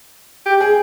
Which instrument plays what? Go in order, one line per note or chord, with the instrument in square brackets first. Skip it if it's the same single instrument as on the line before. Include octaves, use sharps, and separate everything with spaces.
[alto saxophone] G4
[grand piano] G#4